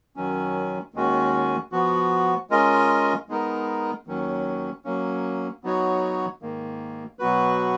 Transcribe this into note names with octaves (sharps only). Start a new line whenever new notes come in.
F#2 D#3 F#3 C#4
D#2 D#3 G#3 C#4 F#4
F3 B3 F#4
G#3 C#4 F4 A#4 D#5
G#3 B3 D#4 A#4
D#2 D#3 F#3 C#4
F#3 A#3 C#4
F#3 B3 D#4 F#4 C#5
G#2 D#3 A#3
B2 F#3 B3 F#4 B4